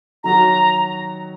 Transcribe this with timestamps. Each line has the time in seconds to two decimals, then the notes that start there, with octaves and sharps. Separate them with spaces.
0.24 D#3 F#3 D#4 F#4 A#5